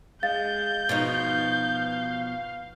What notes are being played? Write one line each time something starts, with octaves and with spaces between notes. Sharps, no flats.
G#3 F5 G6 A6
B2 F3 D#4 F5 A6